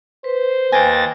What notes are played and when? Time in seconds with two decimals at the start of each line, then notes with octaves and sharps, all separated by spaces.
0.24 B4 C5
0.72 D#2 G5 G#5 A6 A#6